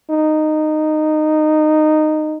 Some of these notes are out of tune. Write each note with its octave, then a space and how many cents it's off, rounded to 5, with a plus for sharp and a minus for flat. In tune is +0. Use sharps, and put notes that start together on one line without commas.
D#4 -15